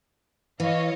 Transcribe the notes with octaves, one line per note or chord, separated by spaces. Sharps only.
E3 C#5 D#5 F5